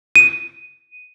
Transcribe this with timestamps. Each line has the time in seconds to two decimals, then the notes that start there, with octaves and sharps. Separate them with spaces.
0.16 D#7